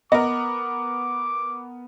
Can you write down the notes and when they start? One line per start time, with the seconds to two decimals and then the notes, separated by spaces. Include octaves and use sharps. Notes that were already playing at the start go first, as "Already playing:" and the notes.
0.12 B3 A#4 D#5 D6